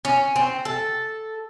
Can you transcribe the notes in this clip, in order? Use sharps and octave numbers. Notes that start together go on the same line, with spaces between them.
C#4
C4
A4